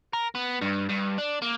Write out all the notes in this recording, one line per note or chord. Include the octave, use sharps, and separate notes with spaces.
A#4
B3
G2
G2
D4
A#3